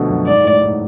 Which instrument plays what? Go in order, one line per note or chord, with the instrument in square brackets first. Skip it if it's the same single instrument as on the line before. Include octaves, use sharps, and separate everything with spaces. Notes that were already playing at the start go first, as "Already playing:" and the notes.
Already playing: [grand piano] B2 D3 F3 A3
F#2
[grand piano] G#2 [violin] D5
[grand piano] A2
G#2